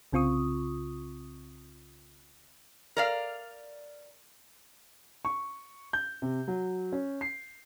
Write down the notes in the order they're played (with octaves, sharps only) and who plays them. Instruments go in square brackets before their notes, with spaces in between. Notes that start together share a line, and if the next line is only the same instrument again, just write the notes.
[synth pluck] C2 C#3 C4 F4 C#6 D#6
[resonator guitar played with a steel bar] A#4 D5 F5
[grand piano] C#6
G6
C3
F#3
C#4
C7